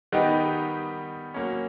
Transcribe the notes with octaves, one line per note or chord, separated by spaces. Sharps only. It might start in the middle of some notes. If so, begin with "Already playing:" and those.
D#3 G3 B3 D#4 G4
F#3 A#3 C#4